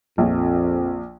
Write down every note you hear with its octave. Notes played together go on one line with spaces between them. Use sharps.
A#1 F2